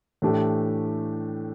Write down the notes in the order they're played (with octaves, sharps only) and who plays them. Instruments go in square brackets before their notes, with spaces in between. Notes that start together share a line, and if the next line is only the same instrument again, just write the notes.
[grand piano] A2 E3 A3 D4 G4